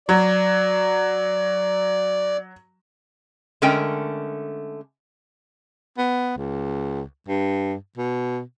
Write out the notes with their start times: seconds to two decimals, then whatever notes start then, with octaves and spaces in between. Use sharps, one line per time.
0.09 F#3 D5
3.62 D3 G#3 A3 C#4 A#4 G5
5.98 B3
6.37 C#2
7.28 G2
7.97 B2